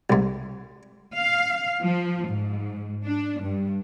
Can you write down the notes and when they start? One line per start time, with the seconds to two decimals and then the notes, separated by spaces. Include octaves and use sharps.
0.10 C2 G#2
1.14 F5
1.81 F3
2.28 G#2
3.05 D4
3.41 G2